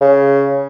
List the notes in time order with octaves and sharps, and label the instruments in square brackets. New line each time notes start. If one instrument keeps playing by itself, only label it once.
[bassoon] C#3